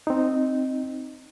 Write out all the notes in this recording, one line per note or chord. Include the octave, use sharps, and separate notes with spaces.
C4 D#4